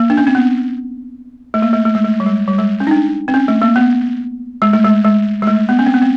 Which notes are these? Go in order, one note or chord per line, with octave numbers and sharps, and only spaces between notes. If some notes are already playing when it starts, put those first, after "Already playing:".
Already playing: A#3
D4
C#4
C4
B3
A3
A#3
A3
A3
G#3
A3
G3
G#3
G3
G#3
C#4
D#4
D4
C4
C#4
A3
A#3
B3
G#3
A3
G#3
G#3
G#3
A3
B3
C#4
C4
B3
C4